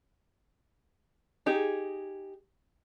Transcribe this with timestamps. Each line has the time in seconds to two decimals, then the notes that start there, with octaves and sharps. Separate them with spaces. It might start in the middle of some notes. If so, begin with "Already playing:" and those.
1.46 D#4 G4 G#4